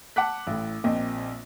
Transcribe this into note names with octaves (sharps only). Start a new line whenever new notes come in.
F#5 A5 D6 F#6 B6
A1 A2
A#1 A#2 C4 D#5